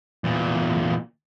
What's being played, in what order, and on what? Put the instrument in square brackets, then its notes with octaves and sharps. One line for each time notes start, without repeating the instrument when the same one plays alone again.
[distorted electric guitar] E2 A#2